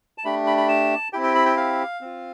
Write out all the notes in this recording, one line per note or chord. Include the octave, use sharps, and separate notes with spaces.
A5
A3 D4 G4 B5
B5
B5
A5
C4 E4 G4 G5
G5
B5
G5
F5
C4 F4